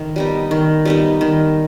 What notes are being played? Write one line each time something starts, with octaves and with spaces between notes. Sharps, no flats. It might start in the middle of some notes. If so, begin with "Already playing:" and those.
Already playing: D#3
G3 B3 D#4
D#3
G3 B3 D#4
D#3